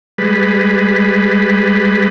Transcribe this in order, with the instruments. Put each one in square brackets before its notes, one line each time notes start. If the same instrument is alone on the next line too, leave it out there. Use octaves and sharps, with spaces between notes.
[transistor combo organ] G3 G#3 B4